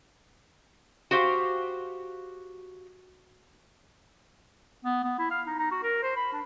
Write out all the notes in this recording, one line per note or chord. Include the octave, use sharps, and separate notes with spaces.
F#4 G4 C5 F5
B3
B3
E4
F5
D#4
D#4
F#4
A#4
C5
B5
D4